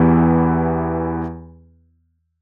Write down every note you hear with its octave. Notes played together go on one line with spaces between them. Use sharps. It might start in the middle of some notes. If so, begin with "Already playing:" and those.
Already playing: E2 E3 B3 E4 G4